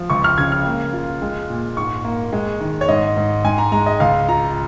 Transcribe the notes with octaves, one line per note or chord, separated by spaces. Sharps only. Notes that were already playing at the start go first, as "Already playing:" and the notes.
Already playing: F3
C#2 C#6
F6
C#3 G#6
F6
A#3
F4
G#3
A#2
G#2 C#6
A#3
G#3
D#3
C#5
G#2 D#5
G#2
G#2 G#5
A#5
G#3 A#5
D#5
C#2 F5
F4 A#5